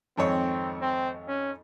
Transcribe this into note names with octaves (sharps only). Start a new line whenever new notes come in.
G#1 F2 C4 C#5
C4
C#4